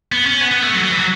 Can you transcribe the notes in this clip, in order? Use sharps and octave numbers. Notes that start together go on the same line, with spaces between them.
B3
C#4
B3
B3
A3
F#3
F#3
E3
F#3